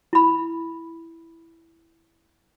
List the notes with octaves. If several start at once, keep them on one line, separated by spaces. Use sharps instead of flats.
E4 B5